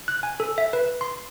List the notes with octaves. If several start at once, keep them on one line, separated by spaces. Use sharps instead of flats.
F#6
G#5
A4
E5
B4
C6